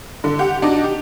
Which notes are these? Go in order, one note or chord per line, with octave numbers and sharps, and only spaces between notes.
D3
G4 F#5
D4 D#4 F#4
G4